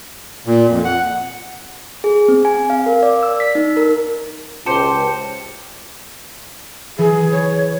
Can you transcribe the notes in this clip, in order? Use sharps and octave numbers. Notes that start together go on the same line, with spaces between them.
A#2
F2
F#5
G#4
C4
G#5
F5
A#4
D5
E6
B6
D#4
A#4
C#2 G4 C5 A5 C#7
E3 G#4
C#5